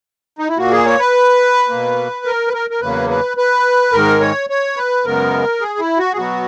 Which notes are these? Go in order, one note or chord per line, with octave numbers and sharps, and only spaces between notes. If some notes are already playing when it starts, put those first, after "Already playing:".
D#4
E4
A#2 A#3 F#4
G#4
C#5
B4
B2 A#3
A#4
B4
A#4
A#4
E2 C#3 F#3 A#3 B4
B4
B4
G#2 D#3 G#3 A#4
C#5
C#5
B4
F#2 C#3 G#3 B3 A#4
G#4
E4
F#4
G#4
B2 F#3 B3 F#4